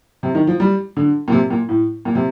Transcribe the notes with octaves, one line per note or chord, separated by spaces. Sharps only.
C3
D#3
F3
G3
D3
A#2
C3
A#2
A2
A#2
C3